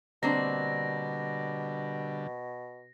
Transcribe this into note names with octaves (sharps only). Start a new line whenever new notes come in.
B2 D3 G3 A#3 C4 D4 A#6